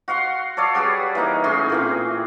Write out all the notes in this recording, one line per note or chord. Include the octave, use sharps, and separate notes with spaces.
F#4 F5 F#5 C6
A4 C#5 D5 F5
G3 F#4 G#4 B4
E3 A#3 D#4 E5
A2 C#4 G#4 C6
A#2 E3 C4